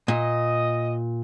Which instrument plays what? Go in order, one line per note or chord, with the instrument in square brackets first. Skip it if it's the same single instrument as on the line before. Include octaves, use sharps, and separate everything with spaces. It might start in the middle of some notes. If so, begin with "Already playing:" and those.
[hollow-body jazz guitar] A#2 [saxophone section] D#5